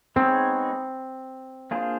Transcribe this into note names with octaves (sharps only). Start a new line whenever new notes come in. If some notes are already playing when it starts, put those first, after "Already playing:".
G#3 B3 C4 D#4 G#4 C#5
A#3 D4 F4 G#4 C5